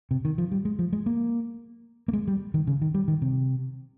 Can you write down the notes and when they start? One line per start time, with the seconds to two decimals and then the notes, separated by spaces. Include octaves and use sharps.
0.11 C3
0.25 D#3
0.38 F3
0.52 G3
0.65 G#3
0.79 F3
0.93 G#3
1.06 A#3
2.08 A#3
2.13 G#3
2.28 G3
2.54 D#3
2.67 C#3
2.82 D#3
2.94 G3
3.08 D#3
3.22 C3